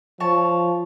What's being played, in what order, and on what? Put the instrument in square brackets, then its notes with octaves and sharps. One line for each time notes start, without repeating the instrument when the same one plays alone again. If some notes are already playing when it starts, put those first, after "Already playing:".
[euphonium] F3 [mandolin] C#5 A5